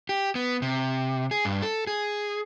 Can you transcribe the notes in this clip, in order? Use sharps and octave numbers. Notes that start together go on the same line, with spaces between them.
G4
B3
C3
G#4
G2
A4
G#4